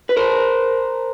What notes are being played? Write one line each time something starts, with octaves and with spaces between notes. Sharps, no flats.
B4
A#4 C5